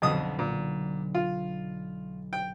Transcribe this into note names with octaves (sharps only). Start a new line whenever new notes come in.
B1 F2 B2 D3 F#3 D#6
A#2
F4
G5